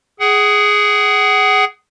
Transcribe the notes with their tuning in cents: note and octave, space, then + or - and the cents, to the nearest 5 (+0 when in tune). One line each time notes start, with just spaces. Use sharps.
G#4 +0 F#5 +35